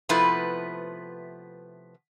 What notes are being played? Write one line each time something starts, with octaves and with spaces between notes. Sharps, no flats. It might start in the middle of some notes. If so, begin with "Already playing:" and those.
C3 F3 A3 B3 E4 B4